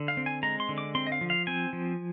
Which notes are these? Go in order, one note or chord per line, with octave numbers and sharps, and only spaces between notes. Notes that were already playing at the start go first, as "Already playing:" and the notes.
Already playing: D3
F5
C4
G#5
G#3 A#5
C6
D3
D6
C4 C6
D#5
F5
F3
F5
C4 G#5
F3